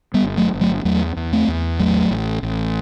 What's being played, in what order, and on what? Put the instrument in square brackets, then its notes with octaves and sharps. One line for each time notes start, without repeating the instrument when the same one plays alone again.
[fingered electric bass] G3 B3
G1
F#3 A3
G1
F#3 A3
E2 F#3 A3
E2
A3 C4
E2
A1 F#3 A3
A1
A1